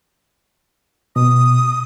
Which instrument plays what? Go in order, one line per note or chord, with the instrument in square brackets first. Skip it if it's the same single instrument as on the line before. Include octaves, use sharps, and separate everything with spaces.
[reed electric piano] B2 [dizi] D#6